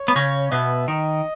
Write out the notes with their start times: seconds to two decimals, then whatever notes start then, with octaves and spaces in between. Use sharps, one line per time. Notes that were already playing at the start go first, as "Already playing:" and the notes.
Already playing: C#5
0.08 B3
0.15 C#3 C#4
0.51 B2 B3 E5
0.88 D#3 D#5